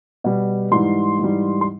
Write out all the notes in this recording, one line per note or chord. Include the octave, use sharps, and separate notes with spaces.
B2 G3
G#2 E3 G3 C6
G#2 E3 G3
C6